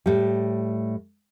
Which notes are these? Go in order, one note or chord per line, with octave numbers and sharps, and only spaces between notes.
A2 G3